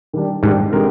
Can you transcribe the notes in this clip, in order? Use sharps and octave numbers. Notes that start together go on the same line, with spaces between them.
D#3 G3 D4
G#2 D#3 G3 D4
D3 G#3 C4 G4 A#4